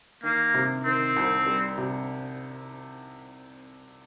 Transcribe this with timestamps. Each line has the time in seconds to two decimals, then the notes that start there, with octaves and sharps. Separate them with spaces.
0.23 D#3 A#3
0.54 C3
0.85 D#3 C4
1.16 C2
1.46 G3
1.78 C3